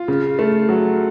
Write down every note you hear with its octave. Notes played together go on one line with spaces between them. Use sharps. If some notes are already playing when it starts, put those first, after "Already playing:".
Already playing: F4
C#3
A3
F#3